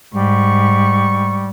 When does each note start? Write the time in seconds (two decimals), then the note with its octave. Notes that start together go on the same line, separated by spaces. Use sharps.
0.14 G#2 G3 C#6